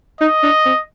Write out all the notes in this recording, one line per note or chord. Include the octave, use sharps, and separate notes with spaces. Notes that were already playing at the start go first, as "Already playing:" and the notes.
D#4 D#5
D4
C4